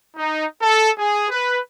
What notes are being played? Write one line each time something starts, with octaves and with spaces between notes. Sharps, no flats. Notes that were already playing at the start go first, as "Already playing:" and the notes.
D#4
A4
G#4
B4